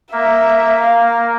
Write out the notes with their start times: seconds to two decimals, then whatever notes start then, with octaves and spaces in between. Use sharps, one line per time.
0.13 A#3 E5
0.81 F5